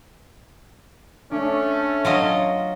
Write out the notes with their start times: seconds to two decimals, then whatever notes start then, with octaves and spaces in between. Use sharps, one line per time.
1.31 A3 C#4 D4
2.05 F#3 F4 D#5